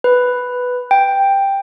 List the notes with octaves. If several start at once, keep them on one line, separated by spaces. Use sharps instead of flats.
B4
G5